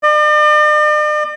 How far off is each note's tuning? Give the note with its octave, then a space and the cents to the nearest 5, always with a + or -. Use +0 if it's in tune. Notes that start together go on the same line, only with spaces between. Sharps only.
D5 +45